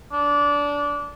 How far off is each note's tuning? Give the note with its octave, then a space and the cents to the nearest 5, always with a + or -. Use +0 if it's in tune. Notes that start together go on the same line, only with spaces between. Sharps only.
D4 -20